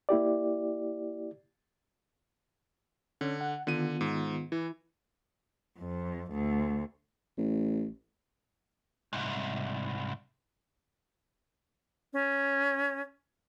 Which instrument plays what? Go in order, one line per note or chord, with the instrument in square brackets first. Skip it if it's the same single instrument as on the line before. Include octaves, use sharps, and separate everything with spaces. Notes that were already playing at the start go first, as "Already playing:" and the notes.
[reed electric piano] A#3 E4 G4 D5
[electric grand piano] D3 [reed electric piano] C#4
[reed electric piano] F#5
[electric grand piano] D3 D#7 [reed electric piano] D#3 B3 F4
[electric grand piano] G#2
[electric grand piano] E3 [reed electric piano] E4
[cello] F2
D2
[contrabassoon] A1
[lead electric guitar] C2 G#2
[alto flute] C#4